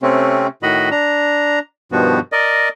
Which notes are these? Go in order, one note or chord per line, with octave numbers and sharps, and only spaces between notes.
C3 A3 C4 C#4
A2 D#3 F#4 D#5 B5
D4 A#5
G2 B2 D#3 F3 B3 F#4
A#4 D5 D#5